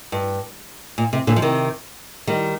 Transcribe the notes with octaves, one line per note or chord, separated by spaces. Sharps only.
G2
A#2
C3
A#2 D3
F3
C3 D#3
D#3 G3